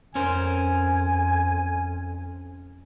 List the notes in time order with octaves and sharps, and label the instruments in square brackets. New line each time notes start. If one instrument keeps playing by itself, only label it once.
[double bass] F2 [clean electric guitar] C#4 A#4 C5 [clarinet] G#5